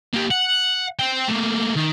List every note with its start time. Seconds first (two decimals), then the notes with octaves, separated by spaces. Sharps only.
0.13 A#3 G4
0.31 F#5
0.99 C5 G5
1.28 A3 A#3
1.76 D#3